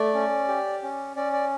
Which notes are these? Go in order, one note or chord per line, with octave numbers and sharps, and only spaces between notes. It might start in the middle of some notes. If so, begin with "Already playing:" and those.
Already playing: A3 D5
C#4
G4
C#4
C#4 D5
D5